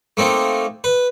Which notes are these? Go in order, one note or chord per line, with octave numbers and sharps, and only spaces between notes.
A3 A#3 C4 D#4
B4